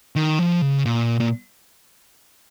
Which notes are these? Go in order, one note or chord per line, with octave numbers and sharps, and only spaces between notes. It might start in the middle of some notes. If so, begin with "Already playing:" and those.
D#3
F3
C#3
A#2
A#2